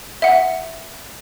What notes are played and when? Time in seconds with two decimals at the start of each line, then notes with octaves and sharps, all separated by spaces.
0.22 E5 F#5